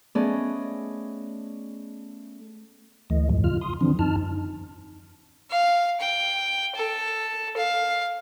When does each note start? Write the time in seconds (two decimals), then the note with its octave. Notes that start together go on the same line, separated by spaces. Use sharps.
0.15 A3 B3 C#4 G#4 D5 D#5
3.10 D2 E3 A3 D#5
3.30 F2 G#2 F3
3.44 C#3 F4 F6
3.61 C6 D#6
3.81 D3 E3 F3 C4 D4
3.99 F#2 D#4 A5 F6
5.50 F5
6.00 G5
6.75 A4
7.57 F5